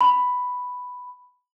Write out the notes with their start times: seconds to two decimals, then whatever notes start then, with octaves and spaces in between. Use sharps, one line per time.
0.01 B5